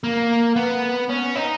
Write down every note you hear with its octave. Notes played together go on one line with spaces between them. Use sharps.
A#3
B3
C#4
D#4